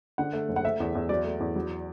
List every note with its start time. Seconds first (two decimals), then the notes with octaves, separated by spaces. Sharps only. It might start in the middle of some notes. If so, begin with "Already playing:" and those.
0.18 D3 F#5
0.33 A3
0.49 F#1
0.56 F#5
0.64 A3 E5
0.80 E2
0.95 E2
1.09 F#3 D5
1.25 A3
1.40 E2
1.56 F#3